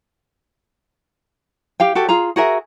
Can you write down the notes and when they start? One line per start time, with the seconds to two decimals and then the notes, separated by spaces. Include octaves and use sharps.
1.80 G4 F5 G5
1.95 F#4 G4 A4
2.09 F4 G#4 A#5
2.36 F#4 G#4 A#4 E5